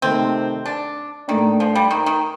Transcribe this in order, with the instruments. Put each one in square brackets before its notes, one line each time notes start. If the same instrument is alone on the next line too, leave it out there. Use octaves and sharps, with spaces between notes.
[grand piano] C3 D#3 A3 [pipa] C4
[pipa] D4
[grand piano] A2 A3 D4 [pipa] D#3
[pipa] F3
G3
D#3
D#3